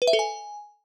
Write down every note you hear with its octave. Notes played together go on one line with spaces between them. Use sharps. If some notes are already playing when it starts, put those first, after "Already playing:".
B4
E5
A4
G#5